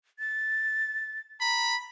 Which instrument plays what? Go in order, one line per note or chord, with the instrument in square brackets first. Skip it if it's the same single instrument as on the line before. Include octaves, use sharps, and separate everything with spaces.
[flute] A6
[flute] A#5 [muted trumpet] B5